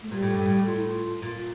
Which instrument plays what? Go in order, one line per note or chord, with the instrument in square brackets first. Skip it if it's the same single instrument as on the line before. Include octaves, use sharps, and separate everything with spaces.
[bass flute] A3
[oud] A#2 [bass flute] G3
[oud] A2
G2
A2
[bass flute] F4
E4
F4
[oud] A#2